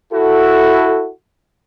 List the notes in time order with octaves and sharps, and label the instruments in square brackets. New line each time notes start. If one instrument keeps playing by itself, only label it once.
[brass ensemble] E4 F#4 A4